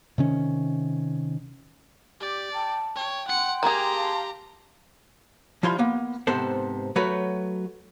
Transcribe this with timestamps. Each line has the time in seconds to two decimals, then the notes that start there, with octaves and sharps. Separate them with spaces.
0.18 C3 D#3 C#4
2.20 G4 D5
2.53 G5 A5
2.96 C#5 G5
3.28 F#5 C6 C#7
3.63 A#3 G4 G#4 A#5
3.94 F5 A5
5.63 F3 G3 E4 F4 C6
5.78 A#3 B3
6.27 G#2 C3 B3 A4 C5
6.96 F#3 A3 F#4 B4 C#5